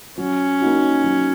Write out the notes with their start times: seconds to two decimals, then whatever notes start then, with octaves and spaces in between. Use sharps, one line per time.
0.18 F#3 C#4
0.61 A#3 D#4 F#4
1.04 F#3